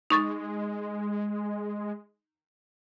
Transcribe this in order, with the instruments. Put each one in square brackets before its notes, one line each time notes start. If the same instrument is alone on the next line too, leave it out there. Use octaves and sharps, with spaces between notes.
[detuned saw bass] G#3 [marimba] D#4 C#6 A6